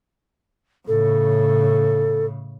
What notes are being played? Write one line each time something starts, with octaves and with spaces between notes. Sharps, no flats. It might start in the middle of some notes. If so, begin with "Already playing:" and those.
A2 C#3 A4